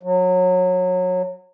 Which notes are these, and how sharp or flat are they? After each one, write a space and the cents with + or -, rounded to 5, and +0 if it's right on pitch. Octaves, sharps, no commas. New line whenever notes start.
F#3 -20